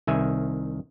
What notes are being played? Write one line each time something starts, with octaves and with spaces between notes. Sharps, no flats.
C2 D#3 E5 G#5